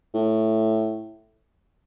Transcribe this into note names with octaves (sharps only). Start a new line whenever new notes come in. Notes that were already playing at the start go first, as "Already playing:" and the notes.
A2